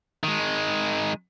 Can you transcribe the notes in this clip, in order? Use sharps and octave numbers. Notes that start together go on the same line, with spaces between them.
D#3 G#3